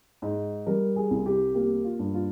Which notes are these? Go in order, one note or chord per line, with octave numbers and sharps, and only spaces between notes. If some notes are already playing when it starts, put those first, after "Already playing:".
G#2
G3 A#4
G#4
C2
G4
A#3 G4
F4
G2
F4